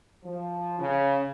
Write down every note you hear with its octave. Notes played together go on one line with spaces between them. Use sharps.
F3
C#3